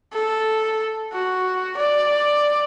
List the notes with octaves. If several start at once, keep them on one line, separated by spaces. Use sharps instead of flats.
A4
F#4
D5